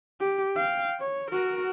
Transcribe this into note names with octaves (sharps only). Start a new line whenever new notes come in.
G4
F5 G5
C#5
F#4 A#4